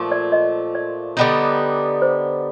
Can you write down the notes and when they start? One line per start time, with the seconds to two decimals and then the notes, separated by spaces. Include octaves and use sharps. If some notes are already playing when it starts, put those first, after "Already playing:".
Already playing: A#2 F3 A3
0.12 D5
0.32 D#5
0.75 D5
1.17 D3 G3 B3 D#4
2.02 C5